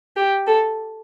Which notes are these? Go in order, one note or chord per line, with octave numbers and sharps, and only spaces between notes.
G4
A4